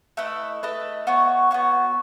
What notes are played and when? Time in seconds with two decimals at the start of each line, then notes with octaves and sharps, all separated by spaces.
0.17 A3 E4 B4 D#5
0.63 A3 E4 B4 D#5
1.07 B3 F#4 C#5
1.51 B3 F#4 C#5